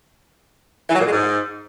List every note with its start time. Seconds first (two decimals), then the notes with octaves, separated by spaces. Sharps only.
0.89 E3
0.95 F#3
1.01 A#2
1.06 G#3
1.12 G#2